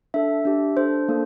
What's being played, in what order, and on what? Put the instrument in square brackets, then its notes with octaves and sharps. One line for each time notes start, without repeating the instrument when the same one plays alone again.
[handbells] D4 A4 E5
D4 G4
D4 A4 C5
A#3 D4 A4